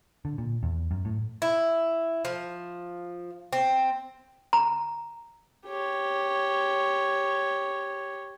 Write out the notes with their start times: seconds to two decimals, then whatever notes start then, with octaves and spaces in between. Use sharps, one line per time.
0.25 D3
0.38 A#2
0.63 E2
0.91 F#2
1.05 A2
1.42 E4
2.25 F3
3.53 C4
4.53 A#5
5.66 G4 C#5